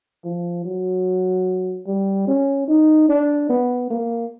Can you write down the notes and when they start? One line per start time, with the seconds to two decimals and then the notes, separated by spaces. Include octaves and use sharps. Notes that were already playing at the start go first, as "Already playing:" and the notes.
0.24 F3
0.65 F#3
1.87 G3
2.27 C#4
2.68 D#4
3.09 D4
3.50 B3
3.90 A#3